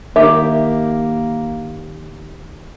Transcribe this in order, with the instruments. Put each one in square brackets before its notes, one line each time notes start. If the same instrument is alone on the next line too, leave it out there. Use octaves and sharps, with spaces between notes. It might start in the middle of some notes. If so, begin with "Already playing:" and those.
[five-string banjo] D#3 G4 E5 [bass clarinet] A#3